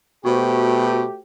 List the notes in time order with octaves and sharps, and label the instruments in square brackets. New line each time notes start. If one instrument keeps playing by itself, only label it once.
[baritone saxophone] B2 [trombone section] A3 G4 [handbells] F#4 C5